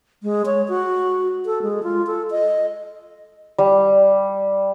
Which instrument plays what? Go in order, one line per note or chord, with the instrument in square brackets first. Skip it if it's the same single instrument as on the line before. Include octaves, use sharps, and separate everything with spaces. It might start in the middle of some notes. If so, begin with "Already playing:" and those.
[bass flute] G#3
C#5
F#4
A4
G#3
F4
A4
D#5
[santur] G3